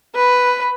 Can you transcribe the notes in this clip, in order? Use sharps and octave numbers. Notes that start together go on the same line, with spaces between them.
B4